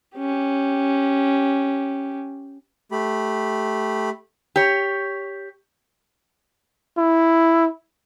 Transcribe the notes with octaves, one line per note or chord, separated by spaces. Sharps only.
C#4 G4
A3 G4 B5
G4 C#5
E4